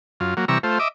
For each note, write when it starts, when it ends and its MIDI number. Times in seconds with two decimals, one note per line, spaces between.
0.20 0.34 42
0.20 0.34 65
0.37 0.45 54
0.37 0.45 58
0.48 0.58 48
0.48 0.58 52
0.48 0.58 55
0.48 0.58 82
0.48 0.58 85
0.48 0.58 88
0.63 0.79 57
0.63 0.79 65
0.63 0.79 72
0.79 0.88 75
0.79 0.88 76
0.79 0.88 86